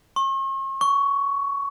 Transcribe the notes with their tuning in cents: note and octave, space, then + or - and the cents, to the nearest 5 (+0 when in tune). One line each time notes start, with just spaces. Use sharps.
C#6 -45
C#6 +15